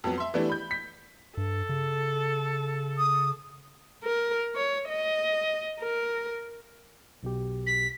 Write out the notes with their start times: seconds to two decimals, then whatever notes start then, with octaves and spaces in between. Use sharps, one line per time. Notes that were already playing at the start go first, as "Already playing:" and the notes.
0.04 F2 F#3 B3
0.18 E5 C6
0.34 E3 G3 A3 B3 D4 E4
0.50 B5 G6
0.71 B6
1.37 G2 A4
1.69 C#3
2.98 D#6
4.04 A#4
4.55 C#5
4.89 D#5
5.80 A#4
7.23 B1 B2 G4
7.67 B6